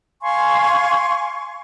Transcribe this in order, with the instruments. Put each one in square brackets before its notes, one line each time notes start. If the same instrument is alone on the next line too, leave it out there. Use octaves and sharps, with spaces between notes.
[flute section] F5 G#5 C6 C#6